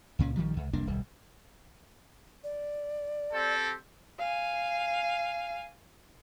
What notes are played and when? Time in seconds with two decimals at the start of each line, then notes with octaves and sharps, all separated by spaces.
0.19 C#2 A#2 C#4
0.36 A#1 D#3 F3 G3
0.57 C#2
0.73 F1 C2 A#3 D4
0.87 D1 B1 G3
2.44 D5
3.33 C4 G4 A4
4.19 F5 G#5